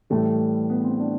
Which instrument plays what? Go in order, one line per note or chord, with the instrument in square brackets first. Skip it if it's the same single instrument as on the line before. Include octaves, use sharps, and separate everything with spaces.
[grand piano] A2 E3 G3 A3
B3
C4
D4